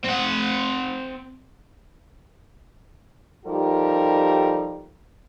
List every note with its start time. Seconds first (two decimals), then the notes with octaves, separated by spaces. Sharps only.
0.04 C4 F#5
3.46 F3 G3 D#4 G4 A4 A#4